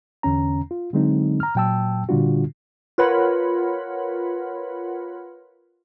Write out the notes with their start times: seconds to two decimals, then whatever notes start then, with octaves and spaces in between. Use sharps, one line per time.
0.23 E2 D3 C#4 A#5
0.71 F4
0.93 D3 F#3 G#3 C4 D#4
1.40 A#5 F6
1.55 A#2 F#3 G5 A5 E6
2.09 A#2 D3 G3 D4 F4 F#4
2.98 F4 A#4 B4 C#5 F#5 B5